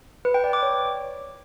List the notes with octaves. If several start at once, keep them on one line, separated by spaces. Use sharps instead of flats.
B4
G5
D5
D6
C#5